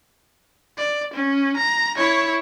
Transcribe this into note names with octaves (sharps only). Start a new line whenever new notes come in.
D5
C#4
A#5
E4 C#5